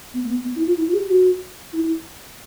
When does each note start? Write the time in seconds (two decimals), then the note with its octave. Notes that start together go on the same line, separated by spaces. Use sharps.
0.14 B3
0.23 A#3
0.29 B3
0.45 B3
0.56 E4
0.67 F4
0.77 E4
0.87 F4
0.93 G#4
0.99 G4
1.09 F#4
1.73 E4
1.84 E4